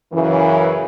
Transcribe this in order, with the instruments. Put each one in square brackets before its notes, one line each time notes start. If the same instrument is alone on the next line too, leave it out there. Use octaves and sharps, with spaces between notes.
[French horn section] F#2 C#3 E3